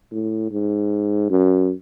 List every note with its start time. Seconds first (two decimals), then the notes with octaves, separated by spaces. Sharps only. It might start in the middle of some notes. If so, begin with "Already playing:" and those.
0.11 A2
0.51 G#2
1.30 F#2